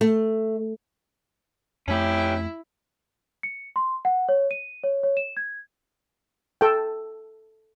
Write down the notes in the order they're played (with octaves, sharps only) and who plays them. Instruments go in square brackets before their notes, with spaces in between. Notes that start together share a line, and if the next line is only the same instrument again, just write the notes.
[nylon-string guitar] A3
[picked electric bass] F2 A3 [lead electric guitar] C#4 G4 [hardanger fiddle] E4
[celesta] C#7
C6
F#5
C#5
D#7
C#5
C#5
E7
G#6
[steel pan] A4 G5